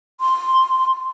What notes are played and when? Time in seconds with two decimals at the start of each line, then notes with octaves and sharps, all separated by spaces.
0.21 C6